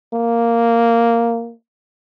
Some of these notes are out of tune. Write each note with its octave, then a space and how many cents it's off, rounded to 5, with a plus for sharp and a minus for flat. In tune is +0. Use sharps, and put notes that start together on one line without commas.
A#3 -5